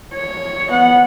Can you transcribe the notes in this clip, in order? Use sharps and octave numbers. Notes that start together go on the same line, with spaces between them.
C#5
B3 F#5